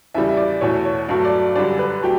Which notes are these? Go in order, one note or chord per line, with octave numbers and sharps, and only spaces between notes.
E2 C#3 G3 E5
E5
D5
E2 B2 A3 C#5
C#5
G2 F#3 A3
D5
F#2 D3 G3 D5
B4
F#3 A3 G4